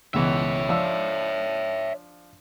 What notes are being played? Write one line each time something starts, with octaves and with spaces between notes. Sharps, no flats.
C#2 B2 E3 C#5 E5
F3 D4 E6